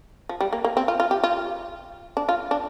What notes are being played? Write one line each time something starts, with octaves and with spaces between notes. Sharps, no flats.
F3
G3
A#3
A#3
C4
F4
F4
G4
F4
D4
F4
D4